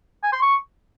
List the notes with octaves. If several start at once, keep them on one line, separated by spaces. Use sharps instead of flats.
G#5
C6
C#6